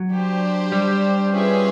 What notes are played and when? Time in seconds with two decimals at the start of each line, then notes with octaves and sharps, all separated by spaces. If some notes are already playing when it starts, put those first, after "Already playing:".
Already playing: F#3
0.11 D4 G4 C5
0.72 G3
1.33 C#4 F4 G#4 B4 E5